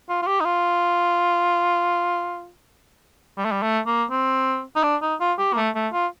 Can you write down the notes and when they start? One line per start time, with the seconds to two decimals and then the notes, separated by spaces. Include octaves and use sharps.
0.09 F4
0.22 F4
0.27 G4
0.41 D#4
0.45 F4
3.38 G3
3.45 A3
3.52 G3
3.62 A3
3.87 A#3
4.11 C4
4.76 D#4
4.83 D4
5.02 D#4
5.20 F4
5.38 G4
5.53 A#3
5.57 A3
5.75 A3
5.93 F4